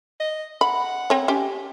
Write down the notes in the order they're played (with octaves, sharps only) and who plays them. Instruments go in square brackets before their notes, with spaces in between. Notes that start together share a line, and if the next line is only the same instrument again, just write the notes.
[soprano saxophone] D#5
[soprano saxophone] F#5 [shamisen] B5
[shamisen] C4 C#5
C#4 G4